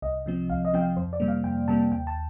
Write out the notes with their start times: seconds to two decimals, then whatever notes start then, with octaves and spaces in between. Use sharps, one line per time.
0.02 C2 D#5
0.26 C3 F3 C4
0.49 C2 F5
0.65 D#5
0.73 C3 F3 C4 G5
0.81 F5
0.97 F2 C5
1.13 D5
1.20 C3 G3 A#3
1.28 F5
1.44 F2 G5
1.68 C3 G3 A#3 A5
1.92 D#2 G5
2.07 A5